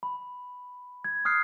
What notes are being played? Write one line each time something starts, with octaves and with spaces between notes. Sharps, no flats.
B5
G#6
D#6 F6 F#6 C7